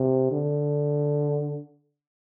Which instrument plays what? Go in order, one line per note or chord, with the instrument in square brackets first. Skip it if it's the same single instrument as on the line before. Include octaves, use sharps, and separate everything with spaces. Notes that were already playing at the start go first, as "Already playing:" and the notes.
Already playing: [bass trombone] C3
D3